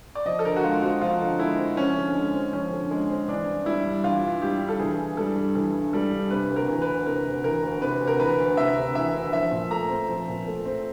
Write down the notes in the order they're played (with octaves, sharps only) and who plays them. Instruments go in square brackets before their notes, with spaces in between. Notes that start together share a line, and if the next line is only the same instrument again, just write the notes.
[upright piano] D5
[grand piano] F3 [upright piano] D#5
[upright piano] A4
[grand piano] D3 [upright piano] A#4
[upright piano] F#4
[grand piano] G#3 [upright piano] F4
[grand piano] C4 [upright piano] F#4
[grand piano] F3 [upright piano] F4
[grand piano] D3
[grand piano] G#3 [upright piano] E4
[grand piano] C4
[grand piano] F3 [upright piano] C#4
[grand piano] D3
G#3
C4
[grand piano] F3 [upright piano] C#4
[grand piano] D3
G#3
C4
[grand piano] E3 [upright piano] D4
[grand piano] G2
[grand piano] G3 [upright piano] E4
[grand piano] G2
[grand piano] E3 [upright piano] F4
[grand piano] G2
[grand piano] G3 [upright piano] G4
[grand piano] G2
[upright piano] A4
[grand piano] E3 [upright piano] G#4
[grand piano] G2
[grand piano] G3 [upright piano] A4
[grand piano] G2
[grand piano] E3 [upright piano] A4
[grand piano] G2
[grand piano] G3 [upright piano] A4
[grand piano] G2
[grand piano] C3 [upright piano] B4
[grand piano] D2
[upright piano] A#4
[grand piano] E3
[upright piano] B4
[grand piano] D2
[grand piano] C3 [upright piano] A#4
[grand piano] D2
[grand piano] E3 [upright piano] A#4
[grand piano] D2
[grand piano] C3 [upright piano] B4
[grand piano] D2
[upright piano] A#4
[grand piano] E3 [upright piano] B4
[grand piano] D2
[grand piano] C3 [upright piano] E5
[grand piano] D2
[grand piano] E3 [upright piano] E5
[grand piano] D2
[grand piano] F3 [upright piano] E5
[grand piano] A#2
[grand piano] A3 [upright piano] A#5
[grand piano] C4
F3
A#2
A3
C4